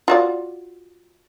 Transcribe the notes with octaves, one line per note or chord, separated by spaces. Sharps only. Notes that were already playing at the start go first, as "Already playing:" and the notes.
F4 F#4 D5